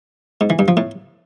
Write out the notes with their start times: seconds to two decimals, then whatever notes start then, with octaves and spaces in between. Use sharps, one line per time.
0.41 G#2
0.50 E3
0.59 G2
0.68 F3
0.77 A2